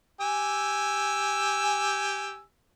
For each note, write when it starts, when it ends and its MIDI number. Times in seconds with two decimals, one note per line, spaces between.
0.21 2.41 67
0.21 2.41 80
0.21 2.41 88